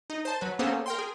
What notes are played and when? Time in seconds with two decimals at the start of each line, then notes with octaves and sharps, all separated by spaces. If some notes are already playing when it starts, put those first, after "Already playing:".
0.10 D#4
0.25 C5 A5
0.41 F#3 B4
0.59 A#3 B3 C#4 G#4 A4 C5
0.86 A#4 G5 C6
0.98 G#4